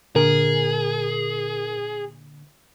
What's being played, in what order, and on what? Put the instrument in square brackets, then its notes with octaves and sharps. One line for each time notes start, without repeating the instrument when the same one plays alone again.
[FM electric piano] A#2 D3 [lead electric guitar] G#4 [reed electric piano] A#4